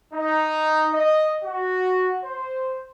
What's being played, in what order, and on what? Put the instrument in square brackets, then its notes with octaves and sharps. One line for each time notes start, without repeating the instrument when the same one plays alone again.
[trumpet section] D#4
D#5
F#4
C5